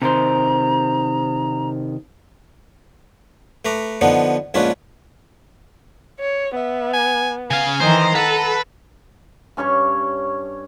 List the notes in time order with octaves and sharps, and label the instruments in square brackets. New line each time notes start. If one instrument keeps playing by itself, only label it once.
[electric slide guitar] C3 D#3 C5 [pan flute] A#5
[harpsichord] A3 B4 A#5 D6
D3 F3 B3 D4 D#4
A#1 G#2 C#4 D4 F4 B4
[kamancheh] C#5
[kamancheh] B3 [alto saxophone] E5
[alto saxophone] G#5
[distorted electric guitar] C#3 F5 [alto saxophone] G#5
[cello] D#3 E3 [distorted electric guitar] C5 [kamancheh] A#5
[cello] A4 [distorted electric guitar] B4 [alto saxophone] F#5
[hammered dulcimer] G2 C#4 C#5 C#6